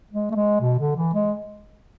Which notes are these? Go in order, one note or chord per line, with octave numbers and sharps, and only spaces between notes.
G#3
A3
G#3
B2
D3
E3
G#3